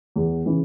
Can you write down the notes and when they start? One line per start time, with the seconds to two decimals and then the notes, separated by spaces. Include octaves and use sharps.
0.16 E2
0.44 C#3 E3